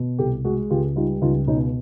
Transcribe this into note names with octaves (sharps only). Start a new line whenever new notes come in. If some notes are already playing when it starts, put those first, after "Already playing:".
Already playing: B2
C2 G4 A4
G#3 F#4 G#4
C#2 F4 G4
G3 D#4 F4
C#2 D#4 F4
B2 C#4 D#4